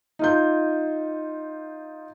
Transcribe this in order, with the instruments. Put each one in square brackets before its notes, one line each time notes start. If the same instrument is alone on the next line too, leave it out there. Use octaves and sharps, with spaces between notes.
[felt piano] D#4 F4 G6